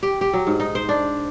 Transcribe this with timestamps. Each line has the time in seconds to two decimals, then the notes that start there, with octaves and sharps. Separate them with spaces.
0.03 G4
0.21 G4
0.34 F#3
0.47 G#2
0.60 D#4
0.75 C5
0.89 D4